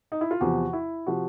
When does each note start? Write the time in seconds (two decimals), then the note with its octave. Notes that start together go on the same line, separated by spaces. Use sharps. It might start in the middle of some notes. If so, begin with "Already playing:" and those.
0.12 D#4
0.21 E4
0.31 F4
0.41 E2 C3 F3 F#4
0.73 E4
1.06 C3 F3 F#4